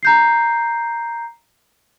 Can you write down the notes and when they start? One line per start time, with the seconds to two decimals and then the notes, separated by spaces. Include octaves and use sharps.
0.03 A#5 G6 C7